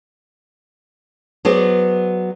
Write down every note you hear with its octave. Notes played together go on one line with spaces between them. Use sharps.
F#3 B3 G#4 C5 D5